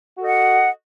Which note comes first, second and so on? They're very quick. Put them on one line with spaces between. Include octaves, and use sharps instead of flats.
F#4 A4 D#5 F#5